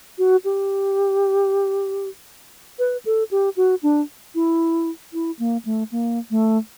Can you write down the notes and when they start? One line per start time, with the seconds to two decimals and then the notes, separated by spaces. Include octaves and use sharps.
0.18 F#4
0.45 G4
2.79 B4
3.05 A4
3.31 G4
3.57 F#4
3.83 D4
4.35 E4
5.13 E4
5.39 A#3
5.65 A3
5.92 A#3
6.31 A3